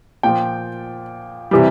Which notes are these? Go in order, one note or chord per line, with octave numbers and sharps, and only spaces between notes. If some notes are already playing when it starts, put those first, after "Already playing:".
A#2 F3 G5
C3 E3 G3